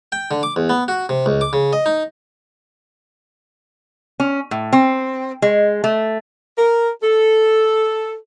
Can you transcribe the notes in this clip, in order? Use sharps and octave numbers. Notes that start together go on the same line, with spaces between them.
G5
D3
D6
E2
B3
F#4
C3
C#2
D6
C#3
D#5
D#4
C#4
A2
C4
G#3
A3
A#4
A4